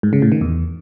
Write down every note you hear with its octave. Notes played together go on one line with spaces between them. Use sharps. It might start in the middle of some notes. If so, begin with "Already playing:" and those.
G#2
C#3
A2
D#3
E2